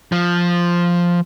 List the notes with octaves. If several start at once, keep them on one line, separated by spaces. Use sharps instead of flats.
F3